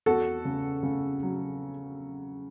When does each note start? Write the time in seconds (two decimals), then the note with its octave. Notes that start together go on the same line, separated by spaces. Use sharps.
0.06 E2 F#4 A4
0.45 C#3
0.83 C#3
1.23 F#3